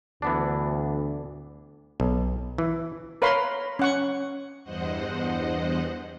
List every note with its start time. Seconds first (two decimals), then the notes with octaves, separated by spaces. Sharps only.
0.22 D2 E3 B3 D4
2.00 B1
2.58 E3
3.22 A#4 B4 C#5 F5 B5 C6
3.79 C#4 F#5 C#6
4.63 E2 G2 C5 D#5 F#5